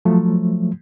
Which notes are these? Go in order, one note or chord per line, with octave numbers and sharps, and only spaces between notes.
F3 F#3 A3